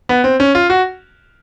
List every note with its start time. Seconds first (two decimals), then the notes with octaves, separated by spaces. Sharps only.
0.09 B3
0.24 C4
0.40 C#4
0.55 F4
0.70 F#4